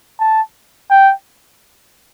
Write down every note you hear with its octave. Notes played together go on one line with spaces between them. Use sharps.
A5
G5